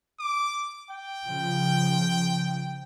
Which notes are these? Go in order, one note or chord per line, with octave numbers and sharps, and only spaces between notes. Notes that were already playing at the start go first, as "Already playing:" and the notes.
D6
G5
C#3 F3